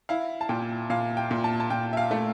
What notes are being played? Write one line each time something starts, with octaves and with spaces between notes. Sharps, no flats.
E4 F5
A5
A#2 G5
A#2 F5
G5
A#2
A5
A5
A#2 G5
E5
F5
A3